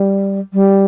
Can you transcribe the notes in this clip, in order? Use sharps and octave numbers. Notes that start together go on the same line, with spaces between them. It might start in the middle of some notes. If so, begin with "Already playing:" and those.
Already playing: G3
G3